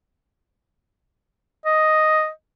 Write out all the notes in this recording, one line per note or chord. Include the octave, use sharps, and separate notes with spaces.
D#5